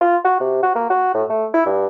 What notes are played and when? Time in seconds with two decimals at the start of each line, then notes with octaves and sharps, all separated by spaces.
0.01 F4
0.25 F#4
0.41 C3
0.63 F#4
0.75 A#3
0.90 F#4
1.14 A2
1.30 A3
1.54 E4
1.66 G2